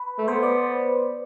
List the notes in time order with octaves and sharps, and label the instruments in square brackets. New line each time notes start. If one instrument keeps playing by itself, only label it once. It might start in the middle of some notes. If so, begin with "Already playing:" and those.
Already playing: [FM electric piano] B4
[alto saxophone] A3
[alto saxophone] B3 [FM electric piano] C5
[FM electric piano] D5